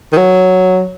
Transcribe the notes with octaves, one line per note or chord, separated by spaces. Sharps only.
D#3
F#3